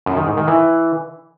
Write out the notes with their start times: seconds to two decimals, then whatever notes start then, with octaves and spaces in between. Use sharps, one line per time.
0.06 F#2
0.17 D#3
0.27 G#2
0.37 D#3
0.47 E3